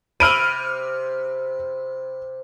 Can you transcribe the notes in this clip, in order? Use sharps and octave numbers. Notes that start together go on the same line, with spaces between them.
C3 B5 E6 F6 D7 D#7